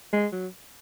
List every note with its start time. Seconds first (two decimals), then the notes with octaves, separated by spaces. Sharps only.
0.13 G#3
0.32 F#3